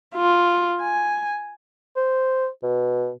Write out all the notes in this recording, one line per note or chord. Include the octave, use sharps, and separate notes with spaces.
F4
G#5
C5
B2